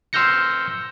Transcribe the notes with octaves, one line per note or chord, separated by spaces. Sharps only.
C6 E6 F6 G6 A#6 C#7